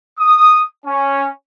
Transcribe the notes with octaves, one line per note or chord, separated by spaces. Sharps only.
D#6
C#4